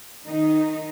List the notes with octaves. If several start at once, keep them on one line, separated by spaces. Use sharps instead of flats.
D#3 D#4